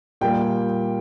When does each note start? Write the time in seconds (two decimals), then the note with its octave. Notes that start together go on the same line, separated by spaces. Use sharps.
0.21 A#2 G3 A#3 G5